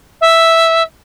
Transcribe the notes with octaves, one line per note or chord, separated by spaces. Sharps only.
E5